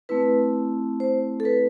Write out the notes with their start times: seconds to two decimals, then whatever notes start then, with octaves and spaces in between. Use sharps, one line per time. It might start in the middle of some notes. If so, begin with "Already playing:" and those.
0.09 A3 C4 E4 B4
1.00 C5
1.40 A4
1.45 B4